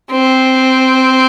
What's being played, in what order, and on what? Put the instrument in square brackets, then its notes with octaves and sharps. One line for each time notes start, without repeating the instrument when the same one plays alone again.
[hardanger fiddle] C4